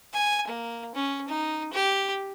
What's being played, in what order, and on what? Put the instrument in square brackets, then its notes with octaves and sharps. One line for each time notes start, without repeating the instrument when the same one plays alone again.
[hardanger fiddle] G#5
A#3
C#4
D#4
G4